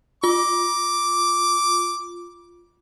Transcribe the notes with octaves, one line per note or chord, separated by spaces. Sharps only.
F4 D6